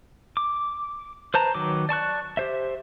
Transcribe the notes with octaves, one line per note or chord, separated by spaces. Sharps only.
D6
B4 C5 A5 A#5
D#3 F#3 B4 D6
D5 A5 C#6 F#6
G4 C5 E5